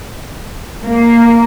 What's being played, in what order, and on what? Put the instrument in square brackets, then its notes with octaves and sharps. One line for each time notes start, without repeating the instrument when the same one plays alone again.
[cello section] A#3